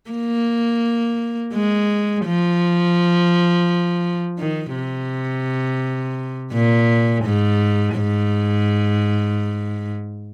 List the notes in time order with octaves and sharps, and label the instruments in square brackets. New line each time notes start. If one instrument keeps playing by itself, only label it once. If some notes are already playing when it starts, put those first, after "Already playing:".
[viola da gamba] A#3
G#3
F3
D#3
C3
A#2
G#2
G#2